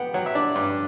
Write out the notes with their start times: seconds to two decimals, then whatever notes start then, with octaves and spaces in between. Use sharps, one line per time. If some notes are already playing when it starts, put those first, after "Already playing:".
Already playing: B3 F#5 G5
0.14 F#3 F#5
0.26 E5
0.35 D4 D5
0.56 G2